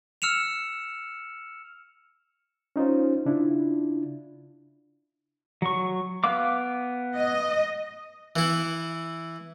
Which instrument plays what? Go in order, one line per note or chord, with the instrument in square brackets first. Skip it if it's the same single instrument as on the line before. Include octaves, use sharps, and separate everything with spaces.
[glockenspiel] E6 F6 C#7 E7 F7
[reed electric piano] C#4 D#4 F4 C5
C#3 D4 E4 F4
[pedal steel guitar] F#3 C#6
B3 F5 D6
[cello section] D#5
[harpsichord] E3 E4